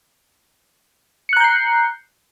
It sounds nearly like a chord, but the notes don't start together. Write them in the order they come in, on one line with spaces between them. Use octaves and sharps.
C#7 F#6 A#5 G6 C7